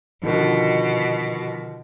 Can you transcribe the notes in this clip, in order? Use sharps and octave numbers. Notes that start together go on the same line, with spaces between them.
B2 D3 D#3 F3